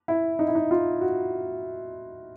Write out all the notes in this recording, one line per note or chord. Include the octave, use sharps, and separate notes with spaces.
E4
D#4
E4
D#4
F4
F#4